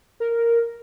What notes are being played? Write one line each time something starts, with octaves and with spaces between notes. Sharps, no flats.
A#4